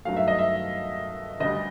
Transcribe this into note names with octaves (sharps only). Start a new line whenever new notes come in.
G2 D#3 F#3 A3 F5
E5
D#5
E5
D2 D3 G3 D#5